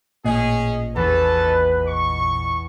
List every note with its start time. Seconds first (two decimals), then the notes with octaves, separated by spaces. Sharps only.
0.25 A1 A#2 C#4 G#4 D#5
0.96 E2 C#4 A4 B4 A5
1.86 C#6